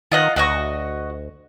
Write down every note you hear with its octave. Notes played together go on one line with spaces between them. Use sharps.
D#3 F4 D#5 F#5
D2 F#4 D#5 C#6